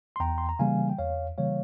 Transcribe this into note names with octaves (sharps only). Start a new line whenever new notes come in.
C6
E2 G5 A#5
C6
A#5
C#3 E3 G3 A#3 F5 G#5
G5
E2 C#5 F5
C#3 E3 G3 A#3 C#5 F5